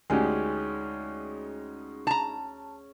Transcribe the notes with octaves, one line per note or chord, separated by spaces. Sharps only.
D2 G#3 C#4 D#4 G4 G#4
A5 A#5